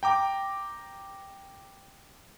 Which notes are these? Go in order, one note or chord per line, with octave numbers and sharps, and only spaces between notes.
G5 A#5 D6